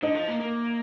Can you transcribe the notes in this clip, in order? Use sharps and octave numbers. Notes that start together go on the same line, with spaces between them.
D3 D#4
F3
A#3
A#3